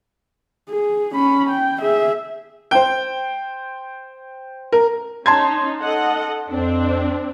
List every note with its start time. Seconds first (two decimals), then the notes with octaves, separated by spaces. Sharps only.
0.70 G#4
1.14 C#4 B5
1.50 G5
1.82 G#4 E5
2.71 C5 G5
4.72 A#4
5.26 C#4 D#4 A5 C6 G#6
5.81 A4 D#5 F#5
6.49 F2 C4 D4